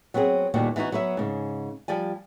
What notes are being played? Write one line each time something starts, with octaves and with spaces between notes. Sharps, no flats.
F#3 B3 C4 E4 G#4
D#2 A#2 D3 G3 B3 F#4
E3 B3 D#4 F4 F#4
F#3 B3 B4 E5
G#2 C#3
F3 G3 D5 G#5